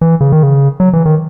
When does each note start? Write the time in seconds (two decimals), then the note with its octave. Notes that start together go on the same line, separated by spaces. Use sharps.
0.01 E3
0.21 C#3
0.32 D#3
0.43 C#3
0.80 F#3
0.93 E3
1.05 D#3